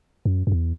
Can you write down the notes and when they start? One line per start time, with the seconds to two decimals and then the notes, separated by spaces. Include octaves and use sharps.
0.25 F#2
0.47 F#2
0.52 E2